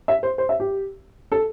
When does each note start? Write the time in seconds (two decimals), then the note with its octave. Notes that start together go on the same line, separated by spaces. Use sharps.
0.08 E5
0.23 C5
0.38 C5
0.49 E5
0.60 G4
1.32 A4